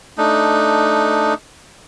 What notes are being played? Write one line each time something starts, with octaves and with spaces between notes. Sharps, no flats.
A3 D4 D#4